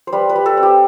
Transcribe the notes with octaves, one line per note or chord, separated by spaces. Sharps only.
C5
G3 B4
B4
G3
A4
C4
G4